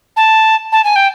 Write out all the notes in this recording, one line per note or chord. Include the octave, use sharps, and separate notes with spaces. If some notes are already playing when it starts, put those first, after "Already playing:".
A5
A5
G#5
G5